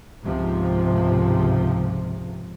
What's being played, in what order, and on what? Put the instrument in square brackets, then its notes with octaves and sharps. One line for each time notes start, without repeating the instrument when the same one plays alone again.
[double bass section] C#2 G#2 C3 F3